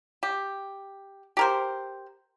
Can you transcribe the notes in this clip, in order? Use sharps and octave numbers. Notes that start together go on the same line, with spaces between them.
G4
G4 A#4 C5